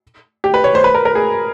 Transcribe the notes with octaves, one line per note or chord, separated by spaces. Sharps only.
G4
B4
C#5
C5
B4
A#4
A#4
G#4